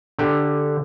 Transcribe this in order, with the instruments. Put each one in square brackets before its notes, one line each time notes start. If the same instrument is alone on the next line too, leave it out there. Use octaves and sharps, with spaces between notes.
[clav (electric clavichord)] D3 G4